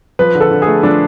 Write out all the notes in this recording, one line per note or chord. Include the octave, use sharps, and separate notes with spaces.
F3 B4
D3
A4
D3
A3 G#4
F3 D4